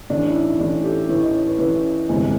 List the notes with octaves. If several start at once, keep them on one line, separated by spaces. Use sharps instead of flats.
A1 A2 E3 D4
E4
D#4
D#4
A1 A2 E3 D4 E4
G4 A4
A1 A2 E3 B4 C#5
C#5 D#5
B4 C#5
A1 A2 E3 B4 C#5
G1 F2 C3 E3 G#3